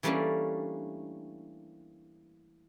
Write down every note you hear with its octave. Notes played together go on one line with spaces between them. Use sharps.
E3 G3 A3 A#3 C#4 D4